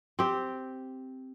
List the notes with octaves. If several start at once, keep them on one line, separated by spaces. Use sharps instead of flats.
C4 G4